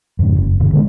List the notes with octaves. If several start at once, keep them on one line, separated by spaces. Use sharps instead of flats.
F2 G#2 C#3
F#1
E1 G2 D3
D3 G#3 B3